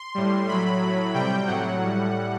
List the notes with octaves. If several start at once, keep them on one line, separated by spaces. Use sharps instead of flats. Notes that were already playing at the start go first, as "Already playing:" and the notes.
Already playing: C6
A2 G3
A2 F#3 B5
A2 F#3
C3 G3 G5
A2 F#3 F#5
A2 G3